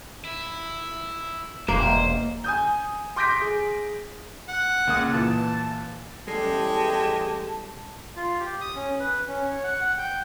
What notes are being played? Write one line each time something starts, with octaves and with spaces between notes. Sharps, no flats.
E4
E1 A#3 C5
G#5 D#6 G6
C6 D6 G6 A#6 B6 D7
G#4
F#5
C#2 A#3 D#6
A#2 E3 A5
A1 E2 G3 G#3 G4 A4 A5 C7
F4
G4
D#6
C#4
B4
C#4
C#5
F#5
F#5
G5